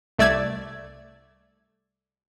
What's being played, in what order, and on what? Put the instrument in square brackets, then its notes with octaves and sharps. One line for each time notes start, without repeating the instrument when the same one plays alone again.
[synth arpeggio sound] C2 A3 D5 E6 G#6